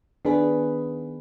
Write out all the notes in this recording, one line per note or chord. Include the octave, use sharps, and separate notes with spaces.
D#3 B3 D4 G#4 B4